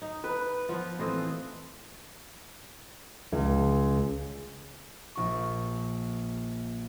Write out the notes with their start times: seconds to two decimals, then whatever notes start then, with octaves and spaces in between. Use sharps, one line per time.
0.02 D#4
0.24 B4
0.69 F3 B3 F4
0.99 A2 E3 C4 A4 C5 D#5
3.32 C#2
5.15 A#1 C#6